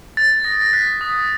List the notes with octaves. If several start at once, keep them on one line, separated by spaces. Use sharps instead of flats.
F#6 A6
D#6 A#6
A#6
F#6 B6
D#6